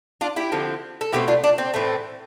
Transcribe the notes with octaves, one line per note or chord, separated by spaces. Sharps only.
D4 F4
E4 G4
D3 F3 C4
A4
B2 A3 C4 E4 G4
D4 F4
D4
C4
A2 E3 A3 C4